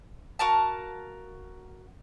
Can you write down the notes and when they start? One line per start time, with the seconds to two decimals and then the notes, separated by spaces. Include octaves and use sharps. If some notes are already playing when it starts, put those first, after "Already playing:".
0.39 F#4 A#4 F5 A5